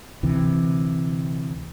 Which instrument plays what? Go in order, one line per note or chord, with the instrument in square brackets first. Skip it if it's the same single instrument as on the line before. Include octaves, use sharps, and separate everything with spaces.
[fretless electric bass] D2 C3 E3